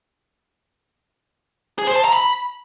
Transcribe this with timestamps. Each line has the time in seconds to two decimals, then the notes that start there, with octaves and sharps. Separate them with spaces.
1.78 G#4
1.87 C5
1.96 A5
2.04 A#5
2.13 B5